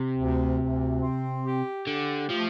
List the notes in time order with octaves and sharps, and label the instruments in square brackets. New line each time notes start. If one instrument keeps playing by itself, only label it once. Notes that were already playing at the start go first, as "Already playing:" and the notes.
Already playing: [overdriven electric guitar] C3
[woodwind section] D2
D2
C4
G4
[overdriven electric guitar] D3 [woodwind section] G4
[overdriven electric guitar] F3 [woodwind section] A3